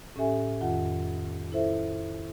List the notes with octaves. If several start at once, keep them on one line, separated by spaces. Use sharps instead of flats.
A2 C#4 G4 A4 E5 G#5
F2 D#3 F4 F#5
E4 A4 C5 E5